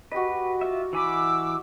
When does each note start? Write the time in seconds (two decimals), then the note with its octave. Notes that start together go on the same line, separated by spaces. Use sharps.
0.12 F#4 G4 B4 D#5
0.61 F4 E5
0.93 E3 G#5 B5 D6 E6